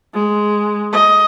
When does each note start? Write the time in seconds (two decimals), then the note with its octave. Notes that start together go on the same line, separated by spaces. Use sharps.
0.14 G#3
0.93 D#5